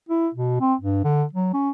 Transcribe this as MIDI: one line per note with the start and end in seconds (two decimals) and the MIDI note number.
0.09 0.28 64
0.35 0.56 47
0.60 0.74 60
0.81 1.04 43
1.05 1.24 50
1.33 1.52 54
1.54 1.71 61